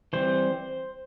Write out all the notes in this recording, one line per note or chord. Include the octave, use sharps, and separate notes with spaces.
E3 G3 C4 C5